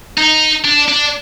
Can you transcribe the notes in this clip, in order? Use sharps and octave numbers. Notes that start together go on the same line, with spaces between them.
D#4
D4
D4